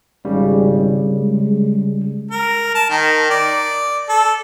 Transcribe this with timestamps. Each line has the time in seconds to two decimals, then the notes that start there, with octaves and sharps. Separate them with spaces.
0.25 G#1 C#3 G3
1.19 G#3
2.31 A#4
2.75 A5
2.90 D#3
3.30 D5
4.09 A4